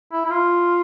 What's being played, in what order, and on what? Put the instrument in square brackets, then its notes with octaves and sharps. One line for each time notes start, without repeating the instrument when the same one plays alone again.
[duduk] E4
E4
F4